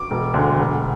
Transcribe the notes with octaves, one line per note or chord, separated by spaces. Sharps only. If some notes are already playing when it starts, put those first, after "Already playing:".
Already playing: D6
E1
D2 D3
E1